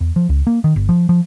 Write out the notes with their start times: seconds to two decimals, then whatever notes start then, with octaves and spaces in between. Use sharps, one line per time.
0.01 E2
0.16 F3
0.29 C#2
0.47 A#3
0.64 D#3
0.76 G1
0.89 F3
1.09 F3